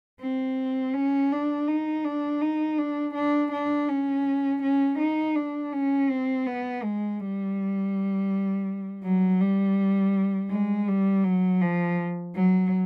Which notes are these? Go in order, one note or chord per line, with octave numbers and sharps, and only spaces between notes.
C4
C#4
D4
D#4
D4
D#4
D4
D4
D4
C#4
C#4
D#4
D4
C#4
C4
B3
G#3
G3
F#3
G3
G#3
G3
F#3
F3
F#3